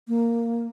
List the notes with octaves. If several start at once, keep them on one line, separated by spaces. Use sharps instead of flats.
A#3